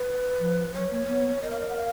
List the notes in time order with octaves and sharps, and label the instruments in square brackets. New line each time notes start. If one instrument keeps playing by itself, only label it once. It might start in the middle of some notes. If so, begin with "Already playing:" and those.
Already playing: [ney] B4
[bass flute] F3
[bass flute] F#3 [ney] C#5
[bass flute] A#3
B3
[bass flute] A#4 [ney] D#5
[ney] F5
D#5
F#5
F5